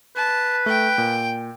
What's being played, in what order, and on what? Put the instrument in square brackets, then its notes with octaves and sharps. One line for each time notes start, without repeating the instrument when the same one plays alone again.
[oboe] B4 [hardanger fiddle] A5
[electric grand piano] A3 [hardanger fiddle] G5
[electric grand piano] A#2